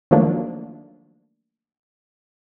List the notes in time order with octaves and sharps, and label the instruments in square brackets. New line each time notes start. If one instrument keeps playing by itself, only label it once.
[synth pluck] D#3 F3 F#3 A3 A#3 D4